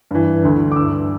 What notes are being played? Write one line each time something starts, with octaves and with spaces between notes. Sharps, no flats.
G2 E3
D2 D3
D6
G2 E3 E6